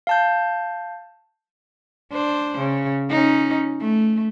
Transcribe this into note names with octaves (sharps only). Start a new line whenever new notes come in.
F5 A5 G6
D4 C5
C#3
C#4 D#4
A3